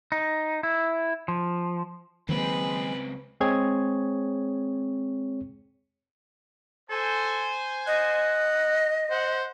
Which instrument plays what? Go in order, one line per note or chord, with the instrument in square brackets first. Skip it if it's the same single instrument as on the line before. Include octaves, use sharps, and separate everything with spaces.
[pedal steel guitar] D#4
E4
F3
[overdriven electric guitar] C#2 C4 [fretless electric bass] D#3 F#3 A#3 [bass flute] G#3 [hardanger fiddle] B4
[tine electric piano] G#3 C4 G#4 C#5 G#6
[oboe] A4 [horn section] C5 G#5
[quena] D#5 [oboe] F#5
[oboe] C5 [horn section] F#5